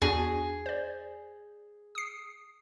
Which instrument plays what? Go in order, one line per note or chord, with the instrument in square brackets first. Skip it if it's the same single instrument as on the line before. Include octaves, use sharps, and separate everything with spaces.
[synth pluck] E2 D4 F#4 [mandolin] G#4
[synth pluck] C5 D5
D#6 C7